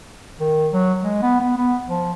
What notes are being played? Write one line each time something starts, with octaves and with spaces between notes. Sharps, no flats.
D#3
F#3
G#3
B3
B3
B3
F3